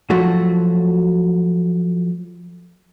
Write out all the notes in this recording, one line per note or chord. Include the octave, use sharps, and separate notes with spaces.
F3 F#3 A3 F#4